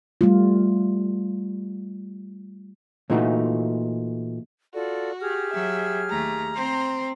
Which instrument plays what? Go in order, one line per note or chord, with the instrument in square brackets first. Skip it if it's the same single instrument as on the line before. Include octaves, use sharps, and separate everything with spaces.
[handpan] G3 A3 F4
[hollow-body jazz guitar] A#2 E3 A3 D#4 F#4
[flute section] F4 A4 D5 [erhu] F#4
[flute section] G4 G#4 F6
[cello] F#3 [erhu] E5
[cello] D#2 A3 [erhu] A#5
[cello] C4 C5